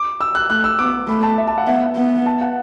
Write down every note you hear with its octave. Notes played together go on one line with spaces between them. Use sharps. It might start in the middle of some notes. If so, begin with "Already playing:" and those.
Already playing: D6
E6
F#6
A3 F#6
E6
B3 D6
A3 B5
A5
E5
A5
F#5
B3 E5
B3
A5
F#5